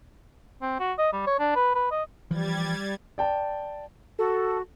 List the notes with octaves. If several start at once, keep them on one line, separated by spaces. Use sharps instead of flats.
C4
F#4
D#5
G3
C#5
D4
B4
B4
D#5
E3 F3 G3 G#6 A6
D5 G5 A5
F#4 A4